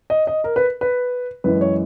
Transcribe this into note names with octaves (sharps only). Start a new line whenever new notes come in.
D#5
D#5
A#4
B4
B4
F#2 E3 G#3 B4
C#5